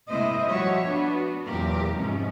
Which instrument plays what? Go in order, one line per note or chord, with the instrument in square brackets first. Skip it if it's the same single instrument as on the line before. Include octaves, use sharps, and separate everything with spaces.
[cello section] C3 G#3 A#3 E4 C5 D#5
F3 G3 F#4 G4 C#5 E5
B3 D4 F#4
E2 A#2 F#3 G4 A#4
G#2 C3 F3 C#4